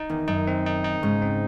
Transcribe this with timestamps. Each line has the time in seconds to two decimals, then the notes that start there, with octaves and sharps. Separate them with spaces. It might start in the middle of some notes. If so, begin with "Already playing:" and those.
Already playing: D#4
0.10 E2 D#3
0.28 F#2 D#4
0.47 C4
0.66 D#4
0.84 D#4
1.03 G#2 C#3
1.22 C4